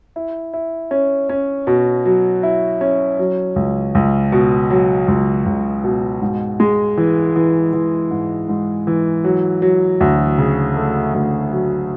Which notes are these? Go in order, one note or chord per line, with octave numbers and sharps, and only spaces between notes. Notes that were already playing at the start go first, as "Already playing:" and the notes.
E4
E4
C#4
C#4
B2
F#3
E4
C#4
F#3
C#2
C#2
B2
F#3
C#2
C#2
B2
G#2
G#3
E3
E3
E3
G#2
G#2
E3
F#3
F#3
D2
C#3
A3
D2
F#3